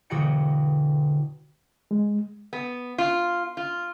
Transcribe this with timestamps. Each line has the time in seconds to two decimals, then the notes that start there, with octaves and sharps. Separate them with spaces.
0.10 E1 D3 F#4 D#5 G5 C#7
1.91 G#3
2.53 B3
2.98 F4
3.57 F4